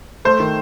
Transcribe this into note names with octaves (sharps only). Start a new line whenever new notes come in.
A3 C5
D#3